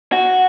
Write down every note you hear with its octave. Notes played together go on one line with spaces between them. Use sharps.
F#4